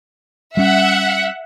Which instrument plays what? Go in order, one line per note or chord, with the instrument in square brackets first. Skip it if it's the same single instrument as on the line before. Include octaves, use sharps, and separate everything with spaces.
[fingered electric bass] G3 C#4 [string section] E5 F#5